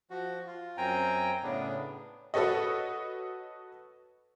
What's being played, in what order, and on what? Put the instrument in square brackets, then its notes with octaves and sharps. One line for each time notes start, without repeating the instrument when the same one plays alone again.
[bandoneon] F3 F#4
F4
F#2 C4 G5 G#5 A#5
A2 C#3 B3 D4
[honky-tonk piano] F#4 A4 B4 C#5 D#5